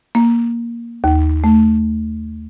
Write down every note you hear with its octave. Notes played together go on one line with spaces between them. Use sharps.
A#3
D#2
A3